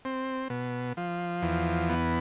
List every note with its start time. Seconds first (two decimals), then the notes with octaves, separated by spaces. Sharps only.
0.05 C4
0.50 B2
0.97 F3
1.42 E2
1.89 B3